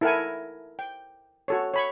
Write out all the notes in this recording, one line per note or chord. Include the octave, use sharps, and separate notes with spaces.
E4 A4 A#4 E5 F#5 G#5
G5
F#4 A4 C#5
C#5 B5 C#6